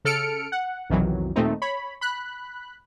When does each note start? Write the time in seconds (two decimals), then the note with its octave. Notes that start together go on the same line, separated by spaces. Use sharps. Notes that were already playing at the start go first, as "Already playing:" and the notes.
0.05 C#3 A4 F6 C#7 D7
0.52 F#5
0.90 B1 F2 C3 D#3 E3 F#3
1.36 D#2 A#2 A3 C4 D#4
1.62 C#5 B5
2.01 B5 F#6